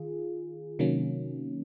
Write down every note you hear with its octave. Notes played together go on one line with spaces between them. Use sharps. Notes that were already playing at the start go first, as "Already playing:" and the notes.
Already playing: D#3 F4 G#4
C3 D#3 F#3 A#3 C#4